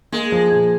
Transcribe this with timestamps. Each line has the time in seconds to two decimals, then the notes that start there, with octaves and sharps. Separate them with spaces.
0.12 G#3 A#3
0.32 F3
0.52 A#2